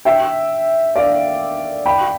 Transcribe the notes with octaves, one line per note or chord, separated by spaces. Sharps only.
E5 G5
D5 F5
G5 B5